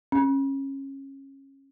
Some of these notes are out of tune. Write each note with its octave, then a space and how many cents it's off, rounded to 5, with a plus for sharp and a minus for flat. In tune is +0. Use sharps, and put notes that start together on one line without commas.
C#4 -25